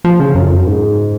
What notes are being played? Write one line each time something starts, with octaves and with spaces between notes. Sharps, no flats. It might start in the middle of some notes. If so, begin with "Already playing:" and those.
F3
C#3
F#2
F2
F#2
G#2